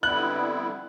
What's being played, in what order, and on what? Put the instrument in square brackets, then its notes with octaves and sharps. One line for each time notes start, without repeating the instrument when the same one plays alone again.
[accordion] F2 D3 G3 B3 E4 [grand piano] F#6